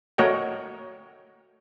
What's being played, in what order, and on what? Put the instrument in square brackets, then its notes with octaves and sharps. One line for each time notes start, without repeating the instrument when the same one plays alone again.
[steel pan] A3 F#4 A#4 C#5 D#5 G5